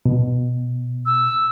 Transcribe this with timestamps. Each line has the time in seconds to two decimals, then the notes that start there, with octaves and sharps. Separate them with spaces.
0.06 B2
1.06 E6